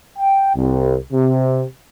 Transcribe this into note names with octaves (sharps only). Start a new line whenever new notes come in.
G5
C2
C3